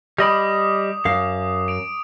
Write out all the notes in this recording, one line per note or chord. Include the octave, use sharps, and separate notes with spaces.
G3 D#5 B5 D6 D#6 F7
F#2 F5
D7 F7